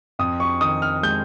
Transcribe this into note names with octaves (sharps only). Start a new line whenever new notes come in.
F2 D#6
C#6
D#3 D#6
F6
G#3 G6